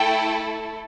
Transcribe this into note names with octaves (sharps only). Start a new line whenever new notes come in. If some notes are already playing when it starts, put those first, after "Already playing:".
Already playing: A3 E4 A4 G5